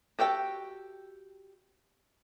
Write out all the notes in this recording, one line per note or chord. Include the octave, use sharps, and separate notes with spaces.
F#4 G4 A4 G5